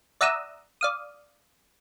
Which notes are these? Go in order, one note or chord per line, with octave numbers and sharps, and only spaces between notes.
D5 E5 F#5 A#5 D#6 E6
D5 F5 D#6